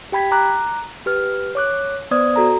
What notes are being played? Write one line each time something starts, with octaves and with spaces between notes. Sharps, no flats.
G4 G5 B5 G#6 B6
A#5 D6 F#6
G4 B4 F6
C#5 D6 F#6
B3 C5 D5 D#6 G#6
F#4 A4 A#5